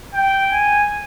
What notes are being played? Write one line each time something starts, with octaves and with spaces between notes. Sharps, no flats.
G5
G#5